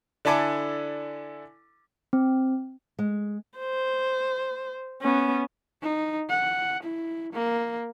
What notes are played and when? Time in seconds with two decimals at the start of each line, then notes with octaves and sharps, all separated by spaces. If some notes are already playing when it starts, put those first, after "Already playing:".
0.25 D3 D4 E4 A4 G#5 D6
2.13 C4
2.99 G#3
3.58 C5
5.02 B3 C#4
5.82 D#4
6.29 F#5
6.82 E4
7.33 A#3